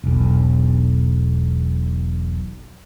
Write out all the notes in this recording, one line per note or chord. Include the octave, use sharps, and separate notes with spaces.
E1 B1